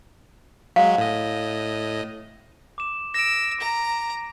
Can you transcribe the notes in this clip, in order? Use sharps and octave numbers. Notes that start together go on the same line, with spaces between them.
F#3 G#3 F5
A2 D#5
D6 E7
E6 A#6 D7
A#5